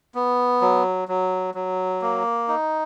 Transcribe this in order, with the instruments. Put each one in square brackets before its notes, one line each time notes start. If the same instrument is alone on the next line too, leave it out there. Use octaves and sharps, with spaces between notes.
[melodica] B3
F#3
F#3
F#3
A#3
D#4